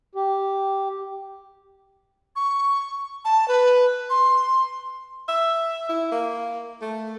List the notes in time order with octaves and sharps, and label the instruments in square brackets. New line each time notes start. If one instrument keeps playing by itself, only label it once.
[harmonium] G4
[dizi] C#6
A5
B4
C6
[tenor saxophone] E5
E4
A#3
A3